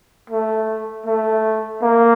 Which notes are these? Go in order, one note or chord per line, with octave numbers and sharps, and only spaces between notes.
A3
A3
A#3